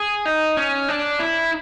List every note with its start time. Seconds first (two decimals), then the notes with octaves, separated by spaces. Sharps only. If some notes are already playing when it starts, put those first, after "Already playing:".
Already playing: G#4
0.25 D#4
0.57 C#4
0.88 D4
1.19 E4